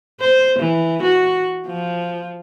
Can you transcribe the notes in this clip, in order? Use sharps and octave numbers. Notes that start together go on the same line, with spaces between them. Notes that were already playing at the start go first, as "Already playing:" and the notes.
C5
E3
F#4
F3